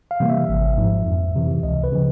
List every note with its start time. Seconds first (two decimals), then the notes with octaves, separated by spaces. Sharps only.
0.11 F5
0.20 C3 E3 G3 A#3
0.30 E5
0.49 G#1
0.77 G#2 F3
1.06 F2
1.36 C3 E3
1.63 C#2 D#5
1.84 B4
1.92 C#3 F3